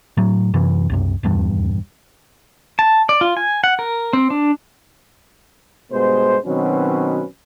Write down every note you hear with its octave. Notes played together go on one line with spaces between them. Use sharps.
A2 F#3
F#2 C3 E3
C2 F#2 C3
D#1 E2 G2
A5
D5
F4
G#5
F#5
A#4
C4
D4
G2 B2 G#3 B3 C5
B2 D#3 F#3 C4 C#4 B4